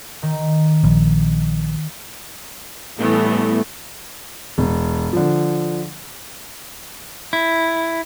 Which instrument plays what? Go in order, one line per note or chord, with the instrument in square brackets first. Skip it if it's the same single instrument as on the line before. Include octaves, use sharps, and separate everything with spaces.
[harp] D#3
[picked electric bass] A#1
[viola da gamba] A2 G3 [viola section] E3 A3 B3
[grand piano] E1
D3 F3
[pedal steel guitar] E4